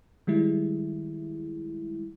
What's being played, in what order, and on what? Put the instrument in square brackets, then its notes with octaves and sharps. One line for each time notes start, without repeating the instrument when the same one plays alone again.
[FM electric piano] D#3 G3 G#3 E4